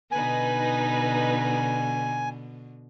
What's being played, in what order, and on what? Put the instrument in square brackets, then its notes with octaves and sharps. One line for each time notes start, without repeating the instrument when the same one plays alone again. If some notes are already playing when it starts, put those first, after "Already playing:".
[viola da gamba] B2 D3 [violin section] D#4 B4 [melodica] G#5